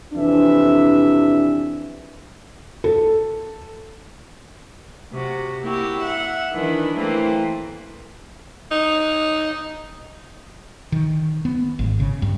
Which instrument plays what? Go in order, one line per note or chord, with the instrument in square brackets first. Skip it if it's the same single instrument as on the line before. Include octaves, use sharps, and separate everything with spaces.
[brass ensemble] F2 C3 E3 D4 E5
[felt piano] A4
[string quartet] C3 F#4
A#3 E4 F#4 G4
E5 F#5
D#3 E3 D4
E3 A3 A#3 C4
[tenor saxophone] D#4
[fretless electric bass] D#3
B3
G#1
C#3
G2